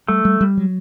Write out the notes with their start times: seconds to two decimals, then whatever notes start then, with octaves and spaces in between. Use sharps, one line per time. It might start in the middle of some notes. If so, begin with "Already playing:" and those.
0.08 G3 A3
0.25 G3
0.41 G3
0.57 F#3